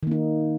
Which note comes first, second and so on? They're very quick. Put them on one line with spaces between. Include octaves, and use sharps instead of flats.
D#3 A#3 D#4